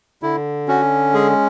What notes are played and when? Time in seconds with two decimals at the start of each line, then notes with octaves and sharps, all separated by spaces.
0.23 D3 E4
0.68 C#4 F#4
1.14 G#3 G#4